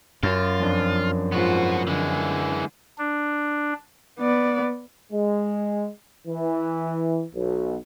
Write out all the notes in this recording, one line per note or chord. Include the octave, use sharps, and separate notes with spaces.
F#2 F4
F2 F3 D4
G#2 B3 F4 F#4
D3 E3 G#3
D4
B3 D5
G#3
E3
B1